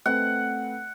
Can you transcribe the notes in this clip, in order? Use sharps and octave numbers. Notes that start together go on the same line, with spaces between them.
A3 C4 B4 F#5